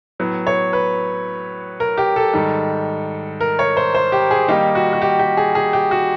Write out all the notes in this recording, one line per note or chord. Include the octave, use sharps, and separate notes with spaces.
A2 F#3 B3
C#5
B4
A#4
G4
A4
G#2 D#3 G3
A#4
C#5
C5
C5
G4
G#4
D#3 G3 A#3 D#4 G4
F#4
F#4
G4
G4
G#4
G#4
G4
F#4